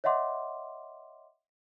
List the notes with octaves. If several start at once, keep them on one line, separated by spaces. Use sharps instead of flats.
C#5 D#5 E5 F#5 C6 D6